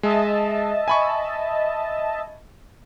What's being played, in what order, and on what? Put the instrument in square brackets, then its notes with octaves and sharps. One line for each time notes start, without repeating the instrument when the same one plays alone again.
[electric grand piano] G#3 [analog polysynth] D#5 E5 A5
[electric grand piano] G#5 B5 C#6